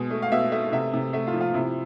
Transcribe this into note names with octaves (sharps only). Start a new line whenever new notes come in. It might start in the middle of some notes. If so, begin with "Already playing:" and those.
Already playing: B2 G#3
A3
F5
B2 E5
A3 E5
C3 E5
C3
A3 E5
F4
F3
F4
C3 E4